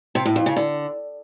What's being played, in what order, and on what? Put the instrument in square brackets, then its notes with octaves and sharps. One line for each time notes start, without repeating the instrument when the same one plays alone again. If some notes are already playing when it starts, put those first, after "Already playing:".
[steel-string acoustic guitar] C3
A2
F2
C#3
D3